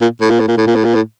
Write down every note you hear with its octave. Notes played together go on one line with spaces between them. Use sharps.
A#2
A2
A#2
A2
A#2
A2
A#2
A2
A#2
A2